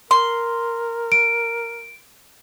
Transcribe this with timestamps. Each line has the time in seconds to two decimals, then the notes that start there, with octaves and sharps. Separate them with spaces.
0.11 A#4 C6
1.12 D7